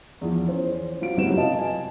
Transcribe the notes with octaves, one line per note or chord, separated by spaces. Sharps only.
E2 F3
C#4 C5
F#3 F4 D7
F#1 C3 F#3 C#4 B4 E7
B4 D#5 F5 A5
G#5 A5